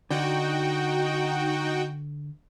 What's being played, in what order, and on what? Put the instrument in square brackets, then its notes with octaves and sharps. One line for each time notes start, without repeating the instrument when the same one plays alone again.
[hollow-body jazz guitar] D3 [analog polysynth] D#4 F#4 G5